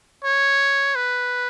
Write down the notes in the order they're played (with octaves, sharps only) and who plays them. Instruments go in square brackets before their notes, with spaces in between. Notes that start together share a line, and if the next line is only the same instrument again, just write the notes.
[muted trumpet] C#5
B4